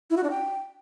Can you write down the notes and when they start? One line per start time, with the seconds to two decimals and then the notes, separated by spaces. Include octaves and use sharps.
0.10 E4
0.17 F#4
0.24 D4
0.30 G5